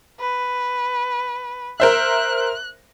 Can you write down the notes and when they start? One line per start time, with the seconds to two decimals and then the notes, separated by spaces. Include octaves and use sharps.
0.20 B4
1.80 A#4 C5 E5 F#6